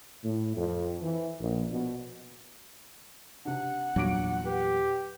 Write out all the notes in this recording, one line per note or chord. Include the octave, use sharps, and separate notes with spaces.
A2
F2
E3
A#1
B2
C3 D4 F#5
E2 G2 A#2 F#3 D6 D7
G4 B4